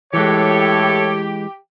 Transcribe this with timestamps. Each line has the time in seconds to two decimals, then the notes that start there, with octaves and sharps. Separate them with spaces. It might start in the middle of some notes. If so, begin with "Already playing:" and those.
0.13 A2 E3 G#3 G4 A4 C#5